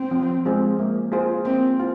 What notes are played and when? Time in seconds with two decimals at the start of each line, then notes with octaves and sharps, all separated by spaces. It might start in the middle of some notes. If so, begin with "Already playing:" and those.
Already playing: C4
0.11 F3
0.45 G#3 C4 F4 G#4
0.79 A#3
1.12 F4 G#4 C5
1.45 A#3 C4
1.79 F4